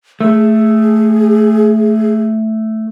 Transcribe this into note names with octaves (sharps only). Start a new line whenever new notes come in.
A3 G#4